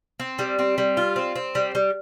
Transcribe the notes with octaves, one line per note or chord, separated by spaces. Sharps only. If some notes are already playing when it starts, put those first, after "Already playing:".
C4
G3
C4
G3
F4
C4
C4
G3
G3